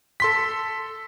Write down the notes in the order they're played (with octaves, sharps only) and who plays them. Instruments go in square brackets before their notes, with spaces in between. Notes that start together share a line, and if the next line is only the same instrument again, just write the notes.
[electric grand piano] A4 C6 B6